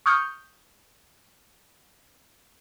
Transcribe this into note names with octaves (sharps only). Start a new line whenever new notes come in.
C#6 D#6 F6 G6 C#7